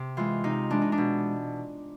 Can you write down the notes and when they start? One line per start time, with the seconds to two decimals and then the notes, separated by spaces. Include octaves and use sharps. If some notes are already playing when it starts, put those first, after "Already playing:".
Already playing: C3
0.17 E3 G#3 F4
0.44 C3 D#4
0.70 E3 G#3 D4
0.82 D#4
0.92 D4
0.98 B2